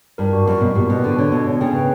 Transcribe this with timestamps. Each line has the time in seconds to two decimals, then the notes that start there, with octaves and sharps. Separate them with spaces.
0.18 G2 A#4
0.33 F#4
0.46 F#2 F#4
0.61 B2 F#4
0.75 A#2 G4
0.90 B2 B4
1.04 D3 F#4
1.18 D3 C#5
1.32 B2 D4
1.47 C#5
1.61 C#3 G5
1.75 B4